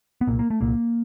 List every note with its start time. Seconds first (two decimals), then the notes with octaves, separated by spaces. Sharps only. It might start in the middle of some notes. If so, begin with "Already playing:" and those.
0.21 B3
0.27 C2 A#2 A#3
0.39 A#3
0.50 A3
0.61 C2 A#2 A#3